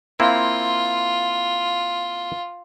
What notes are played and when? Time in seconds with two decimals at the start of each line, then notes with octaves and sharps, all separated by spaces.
0.20 A#3 C4 E4 F4